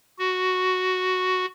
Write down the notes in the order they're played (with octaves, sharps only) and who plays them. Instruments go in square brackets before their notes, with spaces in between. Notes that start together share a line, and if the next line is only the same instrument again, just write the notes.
[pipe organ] F#4